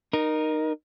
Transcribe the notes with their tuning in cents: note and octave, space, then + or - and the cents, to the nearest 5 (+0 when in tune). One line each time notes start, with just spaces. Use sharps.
D#4 -15 A#4 +10